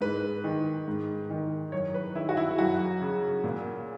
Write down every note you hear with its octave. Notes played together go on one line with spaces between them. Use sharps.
G#2 B4
D#3
G#2
D#3
F#2 C#5
B4
D#3 E4
F#4
E4
F#2 F#4
C#3
A#2